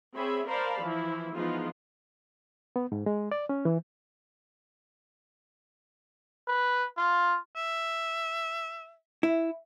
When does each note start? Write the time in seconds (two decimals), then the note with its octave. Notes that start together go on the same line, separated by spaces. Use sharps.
0.15 C4 G#4 C#5 E5 B5
0.48 A#4 C5 D5 F5 A5 B5
0.81 E3 F3 E4
1.35 E3 F3 G#3 B3 D#4 F4
2.76 B3
2.92 G#2
3.06 G#3
3.32 D5
3.49 C#4
3.65 E3
6.48 B4
6.97 F4
7.56 E5
9.23 E4